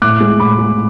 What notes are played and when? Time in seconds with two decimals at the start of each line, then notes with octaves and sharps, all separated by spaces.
0.02 A2 D6 F#6
0.20 G#3
0.40 A2 B5 D6
0.59 G#3